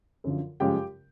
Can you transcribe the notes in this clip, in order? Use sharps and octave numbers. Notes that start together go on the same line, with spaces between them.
F#2 D3 F3
F#2 C#3 F3 G#3 G4 G5